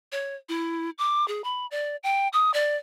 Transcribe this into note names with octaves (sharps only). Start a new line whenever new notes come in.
C#5
E4
D6
G#4
B5
D5
G5
D#6
D5